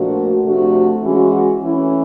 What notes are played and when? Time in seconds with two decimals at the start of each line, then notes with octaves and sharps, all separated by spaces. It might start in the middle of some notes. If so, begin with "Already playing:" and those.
Already playing: A#2 F3 A3 D4 F#4
0.44 C3 F3 A3 D4 F#4
1.03 E3 G#3 C#4 F#4
1.62 E3 A3 C#4 E4